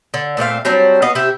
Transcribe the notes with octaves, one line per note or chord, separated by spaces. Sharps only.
D3
A#2 A3 C4 F5
F#3 G3 C4 D4
B3 F#4 D#5 F5
C3 E4 G4